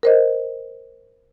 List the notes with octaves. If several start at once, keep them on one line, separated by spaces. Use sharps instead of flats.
A#4 C5 D#5